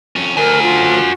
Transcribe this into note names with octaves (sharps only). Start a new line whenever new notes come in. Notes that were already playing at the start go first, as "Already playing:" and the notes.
F2 C#4
D2 F#4 A#4 G#5
F4